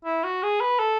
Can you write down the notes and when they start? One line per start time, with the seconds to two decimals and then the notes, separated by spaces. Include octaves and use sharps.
0.05 E4
0.24 F#4
0.43 G#4
0.61 B4
0.79 A4